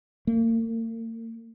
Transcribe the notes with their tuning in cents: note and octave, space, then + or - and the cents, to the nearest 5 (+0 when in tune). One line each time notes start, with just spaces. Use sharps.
A#3 -45